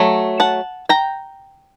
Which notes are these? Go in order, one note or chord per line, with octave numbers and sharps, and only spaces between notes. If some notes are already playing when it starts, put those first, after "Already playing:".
Already playing: F#3 A3
F#5 A5
G5 A#5